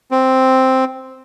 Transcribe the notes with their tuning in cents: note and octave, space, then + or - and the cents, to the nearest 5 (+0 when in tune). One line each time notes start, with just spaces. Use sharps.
C4 +0